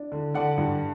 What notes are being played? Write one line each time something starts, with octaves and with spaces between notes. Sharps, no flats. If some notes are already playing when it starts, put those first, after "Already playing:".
Already playing: D4
D3
D3 D5 F#5
G2